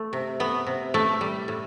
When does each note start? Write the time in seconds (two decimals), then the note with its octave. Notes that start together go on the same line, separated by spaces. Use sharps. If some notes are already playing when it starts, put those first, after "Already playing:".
Already playing: A3
0.13 C3
0.40 A3 B3
0.67 C3
0.94 A2 A3
1.21 G3
1.48 A2